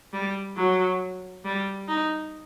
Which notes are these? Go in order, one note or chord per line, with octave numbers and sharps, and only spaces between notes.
G3
F#3
G3
D#4